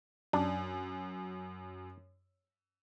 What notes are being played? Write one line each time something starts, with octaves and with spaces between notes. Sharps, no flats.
F#2 D4